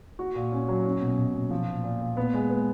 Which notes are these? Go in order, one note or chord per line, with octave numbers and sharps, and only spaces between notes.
F#4
A#2
C#4
F#3
C#4
B2
B2
B2
F3
A#2
A#2
A#2
B3
G#3
B3